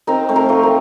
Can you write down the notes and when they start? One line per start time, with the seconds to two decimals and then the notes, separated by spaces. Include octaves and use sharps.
0.07 C4 D#4 A#4
0.29 A3 C4
0.36 A#4
0.49 F3 A3
0.63 A#4